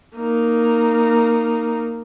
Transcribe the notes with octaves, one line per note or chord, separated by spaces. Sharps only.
A#3 D#4